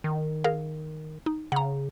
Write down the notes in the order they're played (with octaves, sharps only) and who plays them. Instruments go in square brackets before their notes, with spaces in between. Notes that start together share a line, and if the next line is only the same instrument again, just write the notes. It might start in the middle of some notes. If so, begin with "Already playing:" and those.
[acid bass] D#3
[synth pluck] G#4 A#4 F5
D#4
[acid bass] C#3 [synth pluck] F#5 A#5